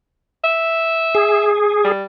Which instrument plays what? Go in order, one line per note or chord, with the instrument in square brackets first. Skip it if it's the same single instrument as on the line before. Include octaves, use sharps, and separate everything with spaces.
[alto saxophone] E5
[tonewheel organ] G#4
[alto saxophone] G3